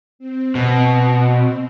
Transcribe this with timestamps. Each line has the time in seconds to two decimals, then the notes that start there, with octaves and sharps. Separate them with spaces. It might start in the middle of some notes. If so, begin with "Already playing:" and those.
0.19 C4
0.55 B2